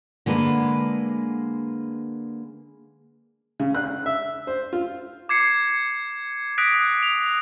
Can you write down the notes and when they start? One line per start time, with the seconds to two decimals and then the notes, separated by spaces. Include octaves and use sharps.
0.26 D3 G#3 A#3 B4
3.60 C#3
3.75 F#6
4.06 E5
4.47 C5
4.73 F4
5.29 D6 G#6 C7 C#7
6.58 D#6 F#6 A#6 B6 D7
7.02 D7 F7